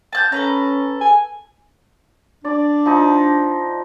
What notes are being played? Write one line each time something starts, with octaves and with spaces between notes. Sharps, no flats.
A5 F#6 G6
C#4 A4 B4 A#5
G#5
D4 D5
F3 D#4